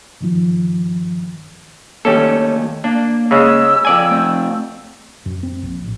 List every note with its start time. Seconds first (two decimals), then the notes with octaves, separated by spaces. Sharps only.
0.21 G2 D#3 F3
2.05 D#3 G3 A3 A#3 C#4 A4
2.84 A#3 D4
3.31 C#3 G#3 E6
3.85 F2 D5 G#5 E6
4.11 A3 C4
5.26 F#2
5.43 C4
5.63 A#1
5.83 A1